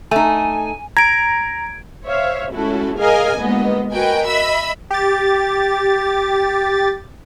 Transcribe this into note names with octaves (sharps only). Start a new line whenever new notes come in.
A3 D#4 G#5
A#5 G#6 D7
C5 C#5 E5 F5
G#3 A3 C#4 E4 F#4 A4
G#4 A#4 D#5 F5 G#5
G1 G#3 A#3 B3 D#5
F#4 A#4 B4 D#5 G5 G#5
D#5 E5 B5 E6
G4 A6